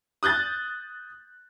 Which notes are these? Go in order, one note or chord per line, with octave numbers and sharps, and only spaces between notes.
D#6 F#6 G6 A6